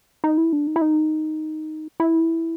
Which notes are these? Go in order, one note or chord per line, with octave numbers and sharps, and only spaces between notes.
D#4
E4
D4
D#4
E4
D#4
E4